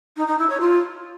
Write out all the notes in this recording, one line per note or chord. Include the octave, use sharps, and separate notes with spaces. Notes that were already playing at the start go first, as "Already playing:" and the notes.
D#4
D#4
E4
C#5
F4